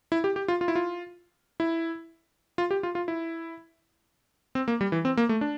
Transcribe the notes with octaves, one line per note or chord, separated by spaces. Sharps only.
E4
G4
G4
F4
F4
E4
F4
E4
F4
G4
F4
F4
E4
C4
A#3
G3
E3
C4
A#3
A3
D4